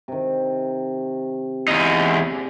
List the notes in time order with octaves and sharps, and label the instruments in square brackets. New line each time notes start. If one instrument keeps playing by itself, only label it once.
[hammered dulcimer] C3 D#3
[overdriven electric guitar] E2 D#4
[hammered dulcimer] G#4 D5